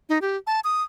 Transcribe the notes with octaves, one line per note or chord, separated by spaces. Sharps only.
D#4
G4
A5
D#6